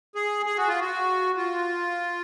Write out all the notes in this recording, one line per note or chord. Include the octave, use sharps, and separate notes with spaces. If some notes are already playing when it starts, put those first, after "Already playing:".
G#4
G#4
F#4
F4
F#4
F4